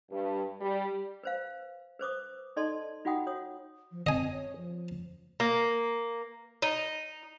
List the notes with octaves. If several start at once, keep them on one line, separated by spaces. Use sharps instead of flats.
G2
G3
B4 C5 F5
B4 C5 D6 D#6
D#4 A4 D5 D#5 A5 C6
D#4 F4 F#4 F#5 G5 D#6
C#5 D#6
F3
C4 D#5 G#5
C#5
F3
A#3
D#4